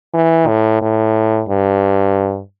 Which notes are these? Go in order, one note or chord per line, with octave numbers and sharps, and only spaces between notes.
E3
A2
A2
G2